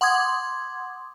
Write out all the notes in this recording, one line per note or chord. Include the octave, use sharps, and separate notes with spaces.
F#5 C6 D6 D#6 G#6